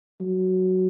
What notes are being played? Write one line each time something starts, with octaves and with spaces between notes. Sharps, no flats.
F#3